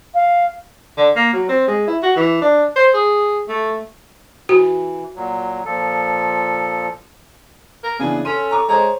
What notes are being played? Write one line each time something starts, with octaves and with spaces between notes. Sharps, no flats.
F5
D3
A#3
F#3
C4
G#3
E4
F#4
E3
D4
C5
G#4
A3
E3 F#4
A#2 F#3
A#2 F3 A4
A#4
C#3 E3 B3 D4 G#4
C#4 A4 C6 D#7
A#5 C#6 D6
G#3 C5 C#5 A#5